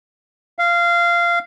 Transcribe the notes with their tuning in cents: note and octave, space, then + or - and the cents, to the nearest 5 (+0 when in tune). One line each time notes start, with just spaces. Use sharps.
F5 -15